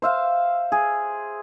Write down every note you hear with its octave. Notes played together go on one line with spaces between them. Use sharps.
C5 E5 F5
G#4